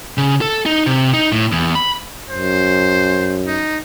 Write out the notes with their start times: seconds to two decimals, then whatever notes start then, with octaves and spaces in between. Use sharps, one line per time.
0.17 C#3
0.41 A4
0.66 D#4
0.86 C3
1.13 D#4
1.32 A2
1.52 E2
1.75 B5
2.29 F#2 C5
3.47 D#4